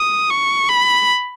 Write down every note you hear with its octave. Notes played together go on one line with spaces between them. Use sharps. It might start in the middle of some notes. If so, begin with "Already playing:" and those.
Already playing: D#6
C#6
B5